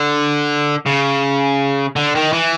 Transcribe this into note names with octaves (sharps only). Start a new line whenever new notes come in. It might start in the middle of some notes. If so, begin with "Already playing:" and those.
Already playing: D3
C#3
D3
D#3
E3